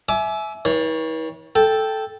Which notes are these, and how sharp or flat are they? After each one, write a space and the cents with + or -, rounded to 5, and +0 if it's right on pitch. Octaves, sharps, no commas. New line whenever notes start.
E5 -5 G#5 +30 D6 +0
E3 -45 C#5 +0
A4 -5 G5 +0